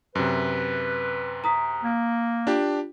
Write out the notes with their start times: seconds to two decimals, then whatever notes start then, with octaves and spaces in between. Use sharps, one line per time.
0.15 F#2 C3 B4
1.44 A#5 D#6 B6
1.83 A#3
2.47 D4 F4 G4